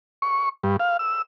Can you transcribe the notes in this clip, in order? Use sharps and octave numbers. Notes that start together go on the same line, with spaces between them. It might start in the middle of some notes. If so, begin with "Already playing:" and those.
C#6
G2
F5
E6